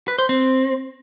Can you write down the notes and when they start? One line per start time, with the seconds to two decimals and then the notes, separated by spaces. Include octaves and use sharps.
0.08 B4
0.19 C5
0.29 C4